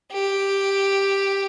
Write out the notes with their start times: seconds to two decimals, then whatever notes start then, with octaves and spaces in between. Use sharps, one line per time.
0.12 G4